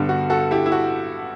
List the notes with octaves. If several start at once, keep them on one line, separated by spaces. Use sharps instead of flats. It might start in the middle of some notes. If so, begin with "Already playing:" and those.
Already playing: G2 D3 G3 B3
F#4
F#4 A4
E4 G4
E4
F#4